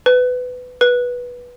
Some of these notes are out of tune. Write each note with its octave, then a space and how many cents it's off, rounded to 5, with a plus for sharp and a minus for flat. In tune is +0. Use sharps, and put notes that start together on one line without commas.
B4 +20
B4 -10